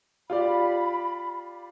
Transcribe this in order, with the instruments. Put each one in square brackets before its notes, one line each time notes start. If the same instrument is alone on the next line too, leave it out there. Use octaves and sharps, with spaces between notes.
[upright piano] F4 G4 D5 [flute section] B5